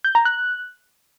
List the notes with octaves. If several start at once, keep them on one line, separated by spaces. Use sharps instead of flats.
G6
A#5
F#6